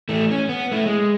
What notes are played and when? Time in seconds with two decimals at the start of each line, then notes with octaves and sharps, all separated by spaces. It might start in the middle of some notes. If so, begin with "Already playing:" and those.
0.09 E3 A3
0.31 C#4
0.49 B3
0.71 A3 E4
0.86 G#3